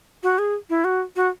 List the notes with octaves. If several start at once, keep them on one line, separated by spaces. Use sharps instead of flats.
F#4
G#4
E4
F#4
F#4